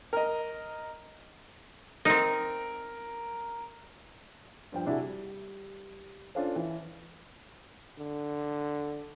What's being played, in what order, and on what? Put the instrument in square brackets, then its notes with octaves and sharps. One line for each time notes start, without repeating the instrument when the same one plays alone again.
[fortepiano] A#4 D#5
[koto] C4 D#4 [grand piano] A#4
[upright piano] G2 F3 G5
C3 D4 E4 F#4 G#4
G3
C#4 D4 F4 A4 C5
E3
[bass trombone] D3